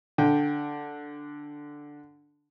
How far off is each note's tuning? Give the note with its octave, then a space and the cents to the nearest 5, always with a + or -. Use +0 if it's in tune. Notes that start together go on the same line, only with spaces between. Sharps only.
D3 +0 G5 +0